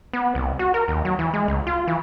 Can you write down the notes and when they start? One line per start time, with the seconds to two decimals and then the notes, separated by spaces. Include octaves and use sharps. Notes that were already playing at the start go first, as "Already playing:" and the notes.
0.13 B3
0.35 C2
0.59 F#4
0.74 A#4
0.88 D#2
1.05 F#3
1.19 E3
1.34 G#3
1.48 C#2
1.67 F4
1.87 E3